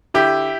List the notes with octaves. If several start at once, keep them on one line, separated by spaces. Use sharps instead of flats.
D3 E4 G4